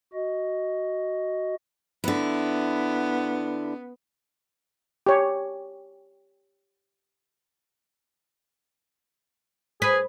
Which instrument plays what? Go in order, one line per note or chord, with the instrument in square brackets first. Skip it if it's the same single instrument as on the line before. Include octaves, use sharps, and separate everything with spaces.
[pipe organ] F#4 D#5
[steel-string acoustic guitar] D3 E4 [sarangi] B3
[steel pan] G4 C#5
[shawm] G#4 [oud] B4